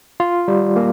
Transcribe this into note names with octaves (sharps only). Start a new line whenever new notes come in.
F4
G3
A#3